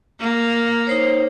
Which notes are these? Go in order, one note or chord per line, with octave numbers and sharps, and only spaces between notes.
A#3
D#4 C5 C#5